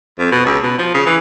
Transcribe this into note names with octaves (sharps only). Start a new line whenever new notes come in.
F2
B2
C#2
B2
F3
C#3
E3